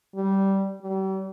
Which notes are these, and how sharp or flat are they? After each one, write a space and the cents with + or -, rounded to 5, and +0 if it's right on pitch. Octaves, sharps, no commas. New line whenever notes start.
G3 -10
G3 -40